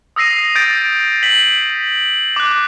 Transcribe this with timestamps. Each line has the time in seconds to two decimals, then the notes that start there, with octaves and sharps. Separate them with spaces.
0.16 D#6 E6 A#6 C7 D#7
0.55 D#6 G6 A6 D7
1.23 B6 F#7
2.36 D6 F#6